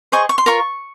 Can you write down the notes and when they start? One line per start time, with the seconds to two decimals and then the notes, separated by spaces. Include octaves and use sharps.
0.12 G#4 C5 D#5 C#6
0.29 C#6
0.38 C6
0.46 F4 A#4 C#5 C#6